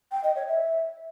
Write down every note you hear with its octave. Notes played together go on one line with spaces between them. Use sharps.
G5
D#5
C#5
E5